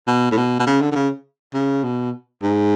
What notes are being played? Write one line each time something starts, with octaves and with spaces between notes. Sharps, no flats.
B2
A2
B2
B2
C#3
D3
D3
C#3
C#3
B2
G#2